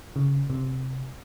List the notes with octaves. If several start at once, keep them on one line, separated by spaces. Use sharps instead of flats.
C#3
C3